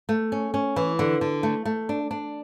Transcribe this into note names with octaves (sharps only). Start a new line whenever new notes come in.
A3
C#4
C#4
E3
D3
D3
A3
A3
D4
D4